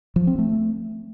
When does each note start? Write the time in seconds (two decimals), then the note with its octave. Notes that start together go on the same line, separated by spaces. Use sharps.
0.16 F3
0.27 C4
0.39 A3